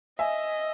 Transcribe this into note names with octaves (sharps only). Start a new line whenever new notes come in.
D#5 E5 G#5